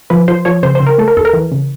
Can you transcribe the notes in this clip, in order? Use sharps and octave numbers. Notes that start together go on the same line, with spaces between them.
F3 B4
F3 C5
F3 C#5
C#3 C5
C5
C#3
A#4
A3 A4
A#4
D#2 A4
A#4
E3
C#3